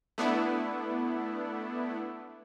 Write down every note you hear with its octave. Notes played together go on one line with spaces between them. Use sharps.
A3 B3 D4 E4